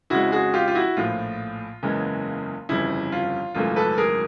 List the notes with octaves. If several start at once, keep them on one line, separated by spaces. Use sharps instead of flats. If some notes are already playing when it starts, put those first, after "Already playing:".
F2 C#3 F3 G#3 E4 F#4
F#4 G#4
F4 G4
F4
E4 F#4
A#1 A2 F3 F4
F#1 E2 C#3 E3 G#3
G1 F2 C#3 E3 G3 E4
F4
G#1 F#2 C#3 E3 A3 F4
A4 B4
G#4 A#4